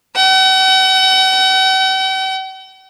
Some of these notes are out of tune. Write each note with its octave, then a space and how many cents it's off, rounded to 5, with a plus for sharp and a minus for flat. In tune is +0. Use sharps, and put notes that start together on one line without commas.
F#5 +45